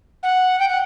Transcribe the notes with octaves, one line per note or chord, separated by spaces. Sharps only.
F#5
G5
F#5